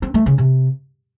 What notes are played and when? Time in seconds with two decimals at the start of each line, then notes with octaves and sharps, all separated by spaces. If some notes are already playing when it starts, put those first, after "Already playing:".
0.02 C4
0.14 A3
0.26 C#3
0.38 C3